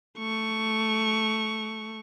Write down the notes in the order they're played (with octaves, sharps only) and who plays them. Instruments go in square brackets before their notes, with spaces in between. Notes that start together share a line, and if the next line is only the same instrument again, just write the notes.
[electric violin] A3 C#6